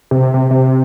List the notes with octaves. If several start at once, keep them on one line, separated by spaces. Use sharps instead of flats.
C3
C3
C3